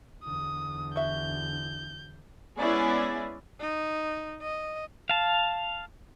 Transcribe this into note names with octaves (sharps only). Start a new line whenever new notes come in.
E2 D3 D#6
F#4 E5 G6
G#3 B3 C#4 E4 G#4 D5
D#4
D#5
F5 A5